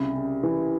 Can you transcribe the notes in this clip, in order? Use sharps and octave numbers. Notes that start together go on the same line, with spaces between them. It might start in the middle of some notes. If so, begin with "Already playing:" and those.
Already playing: C2 C#3
C#3
E3